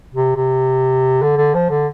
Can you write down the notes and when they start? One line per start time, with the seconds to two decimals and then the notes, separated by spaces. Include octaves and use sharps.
0.15 C3
0.36 C3
1.22 D3
1.38 D3
1.55 F3
1.70 D3